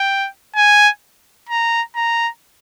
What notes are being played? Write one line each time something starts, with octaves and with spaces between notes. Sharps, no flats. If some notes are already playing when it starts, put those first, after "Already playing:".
Already playing: G5
G#5
A#5
A#5